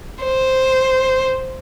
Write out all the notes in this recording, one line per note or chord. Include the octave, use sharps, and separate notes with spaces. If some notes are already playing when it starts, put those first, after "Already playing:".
C5